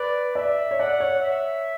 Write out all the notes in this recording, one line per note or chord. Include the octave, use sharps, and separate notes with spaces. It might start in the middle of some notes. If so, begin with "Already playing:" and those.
Already playing: B4 D5
D5 E5
C#5
D5 F#5
C#5
E5